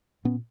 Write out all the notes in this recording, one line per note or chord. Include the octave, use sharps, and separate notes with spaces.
A#2 B3 C#4